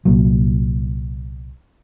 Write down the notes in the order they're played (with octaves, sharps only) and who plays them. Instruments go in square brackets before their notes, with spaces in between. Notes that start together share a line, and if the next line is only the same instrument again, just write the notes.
[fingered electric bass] C2 A#2 F#3